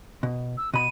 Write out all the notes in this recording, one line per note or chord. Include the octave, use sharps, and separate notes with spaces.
B2
E6
B2 B5 D#7